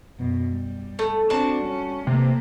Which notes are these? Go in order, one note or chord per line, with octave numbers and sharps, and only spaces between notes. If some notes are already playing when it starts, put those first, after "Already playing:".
F#2 B2
G3
A3
C4 D4 F#4 A5
G3 C#4
C3 A3 A#3